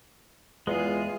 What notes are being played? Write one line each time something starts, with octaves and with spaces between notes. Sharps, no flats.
E2 G#3 B3 F4 G#4